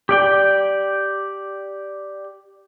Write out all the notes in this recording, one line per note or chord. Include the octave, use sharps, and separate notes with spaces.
G4 D5 G5